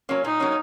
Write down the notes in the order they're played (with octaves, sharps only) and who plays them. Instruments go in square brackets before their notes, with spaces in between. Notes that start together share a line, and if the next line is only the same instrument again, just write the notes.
[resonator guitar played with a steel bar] F#3 A#3 C#4
[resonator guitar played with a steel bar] A#2 [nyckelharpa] D#4
[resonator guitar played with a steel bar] F#3 A#3 C#4